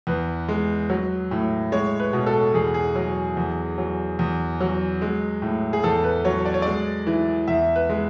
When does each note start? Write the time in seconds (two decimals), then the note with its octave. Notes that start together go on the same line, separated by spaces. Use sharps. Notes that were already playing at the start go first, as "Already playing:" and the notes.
0.07 E2 B4
0.49 G#3
0.90 F#3
1.31 A2
1.72 G#3 C#5
2.00 B4
2.13 B2
2.26 A4
2.54 E2 G#4
2.74 G#4
2.96 F#3
3.37 E2
3.78 F#3
4.19 E2
4.61 F#3
5.02 G#3
5.42 A2
5.73 G#4
5.84 E2 A4
6.04 B4
6.25 F#3 C#5
6.45 D5
6.54 C#5
6.62 G#3 D5
7.07 E3
7.48 E2 E5
7.76 B4
7.90 G#3